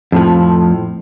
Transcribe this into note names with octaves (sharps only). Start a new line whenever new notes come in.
F2 A2 F3